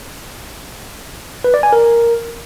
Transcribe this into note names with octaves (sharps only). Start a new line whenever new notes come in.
B4
D5
G#5
A#4